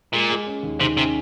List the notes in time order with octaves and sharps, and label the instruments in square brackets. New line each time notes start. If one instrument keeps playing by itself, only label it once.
[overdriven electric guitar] A#2 [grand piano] G#3
[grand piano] G#3
C#4
D#2
[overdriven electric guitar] C3 [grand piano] D#3
[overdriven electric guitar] C3 [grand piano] C#4